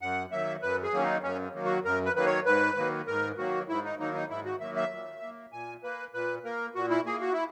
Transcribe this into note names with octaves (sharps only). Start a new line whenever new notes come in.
F#2 F#5
D#3 F#3 A#3 E5
F#2 B4
G#4
D#3 F#3 A#3 C#4
D#4
F#2 C#4
D#3 F#3 A#3
F#4
F#2 A#4
B4
D#3 F#3 A#3 B4
C#5
G#2 B4
D#3 F#3 A#3
G#2 A#4
D#3 F#3 A#3 F#4
G#2 E4
D#4
D#3 F#3 A#3 D#4
D#4
G#2 E4
F#4
D#3 F#3 A#3 E5
E5
A#2
A#3
A#2 G#5
A#3 B4
A#2 B4
A#3 A#4
A#2 F#4
E4
A#3 G#4
F#4
E4